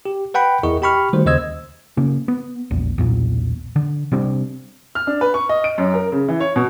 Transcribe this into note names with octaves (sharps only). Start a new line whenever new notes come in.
G4
B4 F#5 G5 B5
E2 E4 G#4 A#4 D#5 C#6
G4 G5 B5 C#6 F6
D#3 G3 A3 F#4 C5
D#2 C#3 C5 D#5 E6 G#6
C#3 A#3
B3
A#1 E2
B1 E2 A#2
D3
C3 G3 C4 D4
F6
D4
B4
C#6
D#5
D7
F#2
A#4
C#3
E3
C#5
B2